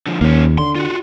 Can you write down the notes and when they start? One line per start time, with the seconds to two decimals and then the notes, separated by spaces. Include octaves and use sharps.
0.06 D3 F3
0.21 D#2 A#3 C#4
0.58 D3 C6
0.76 F4 F#4